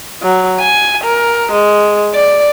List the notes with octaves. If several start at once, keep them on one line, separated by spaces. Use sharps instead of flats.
F#3
G#5
A#4
G#3
D5